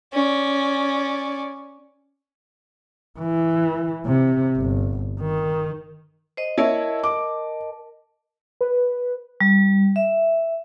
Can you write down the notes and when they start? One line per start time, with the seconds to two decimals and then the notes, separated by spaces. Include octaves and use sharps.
0.13 C#4 D5
3.19 E3
4.06 C3
4.56 G1
5.20 D#3
6.37 C5 D#5
6.58 E4 A#4 C#5 D#5 A5
7.03 D6
8.61 B4
9.41 G3
9.96 E5